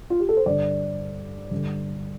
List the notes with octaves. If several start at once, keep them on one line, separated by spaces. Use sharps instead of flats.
F4
G4
A4
C5
G2 D3 D5
G2 D3